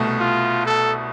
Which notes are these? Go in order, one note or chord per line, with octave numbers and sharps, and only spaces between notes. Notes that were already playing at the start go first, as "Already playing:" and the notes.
Already playing: C2 B2 A3
F4
A4